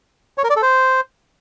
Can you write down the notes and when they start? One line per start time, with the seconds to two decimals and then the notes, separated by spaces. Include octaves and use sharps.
0.38 C#5
0.44 A#4
0.50 D5
0.56 A4
0.62 C5